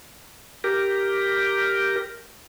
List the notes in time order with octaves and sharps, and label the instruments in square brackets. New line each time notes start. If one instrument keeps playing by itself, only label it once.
[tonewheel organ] G4 A#4